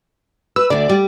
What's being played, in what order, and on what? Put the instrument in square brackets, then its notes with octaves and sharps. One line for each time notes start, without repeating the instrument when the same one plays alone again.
[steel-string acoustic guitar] B4 [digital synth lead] E6
[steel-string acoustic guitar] D2 D3 [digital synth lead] D5
[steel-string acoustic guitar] G3